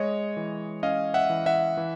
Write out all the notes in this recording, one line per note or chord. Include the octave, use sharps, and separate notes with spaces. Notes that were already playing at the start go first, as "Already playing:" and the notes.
Already playing: G#3 C#5 D#5
E3
C#4 D#5 F5
E5 F#5
E3
E5 F#5
E3